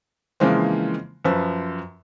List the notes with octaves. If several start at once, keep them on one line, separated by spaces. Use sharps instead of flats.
C#3 E3 F3 G#3 A#3 C4
F#2 F3 B4 E6